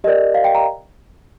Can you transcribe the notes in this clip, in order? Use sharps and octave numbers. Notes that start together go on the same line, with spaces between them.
G4 A#4 D5 D#5
F5
G5
A#5